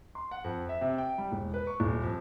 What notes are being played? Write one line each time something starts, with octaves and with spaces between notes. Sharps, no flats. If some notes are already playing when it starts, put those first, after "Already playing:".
C6
F#5
F2
E5
C3
G5
G3
E1
B4
C#6
D#1
F2